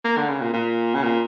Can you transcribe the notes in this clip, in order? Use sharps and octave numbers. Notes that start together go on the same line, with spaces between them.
A#3
D3
C#3
A#2
A#2
C#3
A#2